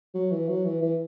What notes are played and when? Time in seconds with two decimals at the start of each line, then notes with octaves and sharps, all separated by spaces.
0.14 F#3
0.31 E3
0.49 F#3
0.65 E3
0.82 E3